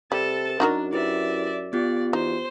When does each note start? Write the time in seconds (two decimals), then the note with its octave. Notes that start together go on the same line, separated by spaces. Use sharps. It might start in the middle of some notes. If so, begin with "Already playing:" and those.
0.12 C3 G3 A4 A5
0.60 F#2 D4 D#4 F#4 A#4
0.93 E4 G4 B4 D5 E5
1.73 B3 F4 G4 D5
2.13 E2 D#4 C5